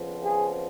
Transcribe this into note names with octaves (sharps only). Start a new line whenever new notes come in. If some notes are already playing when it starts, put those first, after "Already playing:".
Already playing: F2 C#3 F3 B3
G#4